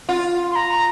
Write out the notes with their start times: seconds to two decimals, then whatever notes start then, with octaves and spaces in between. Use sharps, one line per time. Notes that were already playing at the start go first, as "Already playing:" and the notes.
0.09 F4
0.51 C6
0.56 A#5